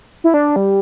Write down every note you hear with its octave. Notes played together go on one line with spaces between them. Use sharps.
E4
D4
G3